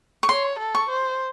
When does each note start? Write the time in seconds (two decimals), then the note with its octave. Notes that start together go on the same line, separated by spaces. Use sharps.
0.23 C#6
0.29 C#5 C6
0.59 A4
0.75 C#6
0.89 C5